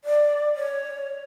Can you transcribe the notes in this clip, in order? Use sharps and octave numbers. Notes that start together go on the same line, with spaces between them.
D5
C#5